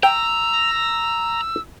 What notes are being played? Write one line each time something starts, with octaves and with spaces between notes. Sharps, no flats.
G5 A#5 E6